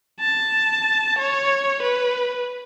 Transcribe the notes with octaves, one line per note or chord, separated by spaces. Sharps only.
A5
C#5
B4